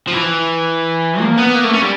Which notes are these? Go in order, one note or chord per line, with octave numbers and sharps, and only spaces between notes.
F3
E3
A#3
B3
A#3
A3
C#4
G3